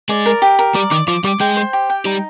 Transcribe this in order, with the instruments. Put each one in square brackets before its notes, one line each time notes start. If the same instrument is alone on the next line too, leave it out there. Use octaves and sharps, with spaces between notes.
[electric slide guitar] G#3 G#4 [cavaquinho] D5
[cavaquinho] A#4
G4
A#4
[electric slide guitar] G3 G4 [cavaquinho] D5
[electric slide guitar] D#3 D#4 [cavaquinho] D6
[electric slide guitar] F3 F4 [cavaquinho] D6
[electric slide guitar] G3 G4 [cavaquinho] D6
[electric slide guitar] G#3 G#4 [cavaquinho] G5
[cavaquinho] C5
G4
G5
[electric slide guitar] G3 G4 [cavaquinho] D#4